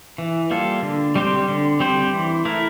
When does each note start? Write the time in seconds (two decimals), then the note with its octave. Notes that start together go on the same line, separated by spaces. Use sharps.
0.18 E3
0.50 G3 A#3 F4 A4
0.83 D3
1.16 G3 C4 G4 C5
1.48 D3
1.80 G3 C4 G4 C5
2.13 E3
2.45 A3 E4 A#4